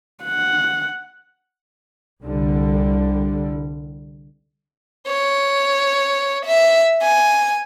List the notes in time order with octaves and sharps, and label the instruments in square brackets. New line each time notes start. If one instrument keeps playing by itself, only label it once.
[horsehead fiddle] F#5
[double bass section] C2 D3 G3
[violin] C#5
E5
G#5